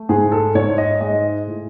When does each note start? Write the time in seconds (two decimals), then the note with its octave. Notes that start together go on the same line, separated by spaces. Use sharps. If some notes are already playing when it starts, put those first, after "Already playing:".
Already playing: A3
0.09 G#2 G#4
0.32 A4
0.55 G#2 C#5
0.78 D#5
1.01 G#3 D#5
1.47 A2